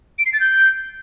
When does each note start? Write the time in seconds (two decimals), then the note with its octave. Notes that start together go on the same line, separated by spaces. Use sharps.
0.19 D7
0.26 C7
0.33 A6
0.40 G6